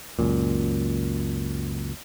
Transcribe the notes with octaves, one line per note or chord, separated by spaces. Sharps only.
C#2 F#2 A#2